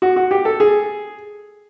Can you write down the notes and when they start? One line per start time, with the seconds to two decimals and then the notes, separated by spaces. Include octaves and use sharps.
0.02 F#4
0.16 F#4
0.31 G4
0.45 A4
0.60 G#4